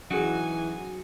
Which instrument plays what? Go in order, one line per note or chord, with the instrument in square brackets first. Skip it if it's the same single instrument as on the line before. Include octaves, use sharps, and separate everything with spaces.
[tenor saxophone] E3 [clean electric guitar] F#3 D#4 F#4 [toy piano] C#4 G#4 [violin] G#5